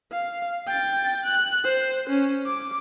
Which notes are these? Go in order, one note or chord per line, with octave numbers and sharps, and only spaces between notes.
F5
G5 A6
F#6
C5
C#4
D6